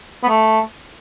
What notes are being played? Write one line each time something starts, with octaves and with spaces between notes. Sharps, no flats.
B3
A3